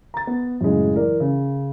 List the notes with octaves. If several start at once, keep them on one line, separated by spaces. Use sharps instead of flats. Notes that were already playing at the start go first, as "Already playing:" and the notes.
A#5 A6
B3
F#2 A2 C#3 G#3
E3 A#4 D5
C#3